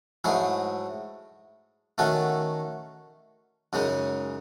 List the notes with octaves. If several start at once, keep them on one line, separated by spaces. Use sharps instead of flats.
G#2 F#3 A3 E4 G#4
D#3 A3 C#4 F#4 A4
F#2 C#3 G#3 D#4